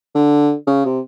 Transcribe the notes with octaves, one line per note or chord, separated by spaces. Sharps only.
D3
C#3
C3